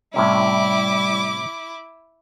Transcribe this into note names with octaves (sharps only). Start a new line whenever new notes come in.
A2 C3 G3 C#4 E4 D6